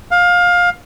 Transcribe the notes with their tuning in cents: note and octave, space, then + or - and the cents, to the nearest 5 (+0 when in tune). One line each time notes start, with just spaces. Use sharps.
F5 +20